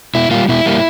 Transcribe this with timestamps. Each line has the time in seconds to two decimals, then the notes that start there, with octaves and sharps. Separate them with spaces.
0.15 B2 E4
0.31 G3 A#3 F4
0.49 B2 E4
0.66 G3 A#3